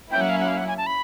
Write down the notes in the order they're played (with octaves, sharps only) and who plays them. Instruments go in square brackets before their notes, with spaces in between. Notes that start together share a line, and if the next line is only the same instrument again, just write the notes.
[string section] F#3 A#3 C#4 E4 [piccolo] G5
[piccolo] F#5
F5
F#5
F5
F#5
G#5
A5
B5